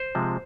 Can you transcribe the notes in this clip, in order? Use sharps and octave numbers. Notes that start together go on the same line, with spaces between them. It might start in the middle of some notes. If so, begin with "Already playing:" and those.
Already playing: C5
C3 F3 G#3